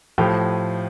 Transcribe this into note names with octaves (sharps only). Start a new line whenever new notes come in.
A2 F3 G4